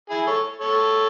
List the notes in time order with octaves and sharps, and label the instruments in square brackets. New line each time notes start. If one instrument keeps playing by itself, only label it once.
[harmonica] E4 G#4
A4 C#5
A4 C#5